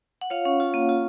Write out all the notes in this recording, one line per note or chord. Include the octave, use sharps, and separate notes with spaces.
F#5
F4 C#5 F5
C#4
F4
A#3
F4